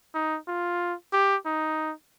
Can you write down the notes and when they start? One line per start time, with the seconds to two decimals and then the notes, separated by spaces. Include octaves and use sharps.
0.14 D#4
0.48 F4
1.13 G4
1.46 D#4